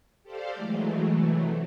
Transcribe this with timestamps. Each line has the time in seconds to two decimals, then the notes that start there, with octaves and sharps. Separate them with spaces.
0.23 G4 A4 C5 D5 F5
0.55 E3 F#3 G#3 A3
1.08 C3 E3 F#3 A3